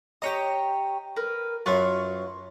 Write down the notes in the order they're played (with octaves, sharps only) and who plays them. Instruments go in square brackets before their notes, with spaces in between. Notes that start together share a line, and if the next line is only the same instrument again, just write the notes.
[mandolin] G4 C#5 A#5 [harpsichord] D#5 G5
[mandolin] A#4 B4
[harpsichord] F#2 F#3 [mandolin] F4 B4 C#6